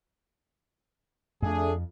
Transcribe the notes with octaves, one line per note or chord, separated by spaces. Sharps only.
F2 A3 D4 G#4